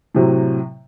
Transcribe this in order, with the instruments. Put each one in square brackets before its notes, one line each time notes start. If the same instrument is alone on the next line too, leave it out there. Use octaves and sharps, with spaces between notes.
[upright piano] A2 C3 F#3